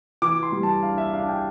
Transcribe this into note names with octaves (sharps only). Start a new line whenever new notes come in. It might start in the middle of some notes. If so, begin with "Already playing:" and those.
E3 D6
C6
G3
A5
D4 F5
E5
D4 F5
A5
G5